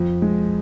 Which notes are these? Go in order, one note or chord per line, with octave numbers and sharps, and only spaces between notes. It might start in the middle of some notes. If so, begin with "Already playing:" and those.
Already playing: F2
G#3